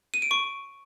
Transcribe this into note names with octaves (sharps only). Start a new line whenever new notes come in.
D#7
D7
C#6